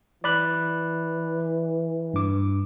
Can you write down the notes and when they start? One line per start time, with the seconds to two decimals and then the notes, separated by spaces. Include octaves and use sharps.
0.24 E3 D5 B5 F#6
2.14 G2 D6